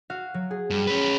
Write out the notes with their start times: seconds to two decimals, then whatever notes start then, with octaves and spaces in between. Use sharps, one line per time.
0.10 F#4 F5
0.34 F#3
0.51 G#4
0.70 G2
0.87 C#4 B4